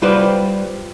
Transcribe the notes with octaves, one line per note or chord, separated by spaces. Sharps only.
G3 F4 G4 B4 C5 D5